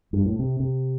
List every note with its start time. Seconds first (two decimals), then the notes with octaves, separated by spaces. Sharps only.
0.13 G2
0.26 A2
0.39 C3
0.60 C3